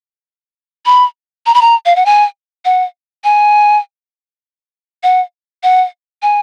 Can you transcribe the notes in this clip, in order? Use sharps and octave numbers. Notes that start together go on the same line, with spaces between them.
B5
A#5
B5
A#5
F5
F#5
G#5
F#5
G#5
F#5
F#5
G#5